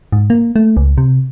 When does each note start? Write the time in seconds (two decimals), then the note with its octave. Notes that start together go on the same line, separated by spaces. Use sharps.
0.12 G#2
0.30 A#3
0.56 A3
0.77 C#2
0.98 C3